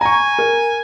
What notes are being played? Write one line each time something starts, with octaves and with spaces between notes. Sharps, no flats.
G#5 A#5 C#6
A#4